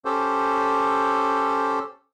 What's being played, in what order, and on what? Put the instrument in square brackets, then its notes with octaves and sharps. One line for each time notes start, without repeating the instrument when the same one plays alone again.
[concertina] C#4 G4 A4 C5